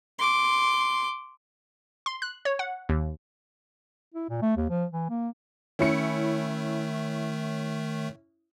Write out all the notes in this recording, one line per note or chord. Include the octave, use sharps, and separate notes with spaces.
C6 D6
C6
F#6
C#5
F#5
D#2
E4
A#2
A3
D#2
F3
E3
A#3
D#3 A3 C#4 E4 C#7